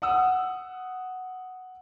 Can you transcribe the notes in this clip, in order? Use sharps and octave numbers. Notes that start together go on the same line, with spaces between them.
F#5 D#6 E6